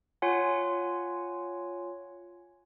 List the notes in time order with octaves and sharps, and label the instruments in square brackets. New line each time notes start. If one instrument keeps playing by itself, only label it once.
[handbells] F4 C#5 F#5 G#5